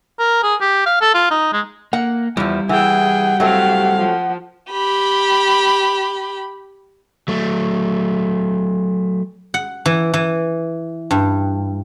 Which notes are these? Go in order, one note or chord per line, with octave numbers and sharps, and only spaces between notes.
A#4
G#4
G4
F5
A4
F4
D#4
G#3
A#3 F#5
E2 F3 G3 E4
E3 G#4 F#5 G5
F#3 A3 C4 G4 F5
F3
G4 B5
F#3 A3
F#5
E3
E3
G2